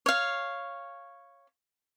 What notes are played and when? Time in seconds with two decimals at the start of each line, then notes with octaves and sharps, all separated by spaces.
0.06 C#5 F5